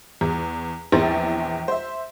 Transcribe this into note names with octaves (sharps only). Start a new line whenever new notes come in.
E2
A#1 E2 E3 C4 A6
C5 E5